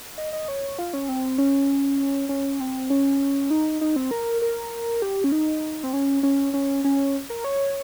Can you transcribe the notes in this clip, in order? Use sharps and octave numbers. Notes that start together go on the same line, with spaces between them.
D#5
D#5
C#5
F4
C#4
C4
C#4
C#4
C4
C#4
D#4
D#4
C4
A#4
A#4
G4
C#4
D#4
C4
C#4
C#4
C#4
C#4
A#4
C#5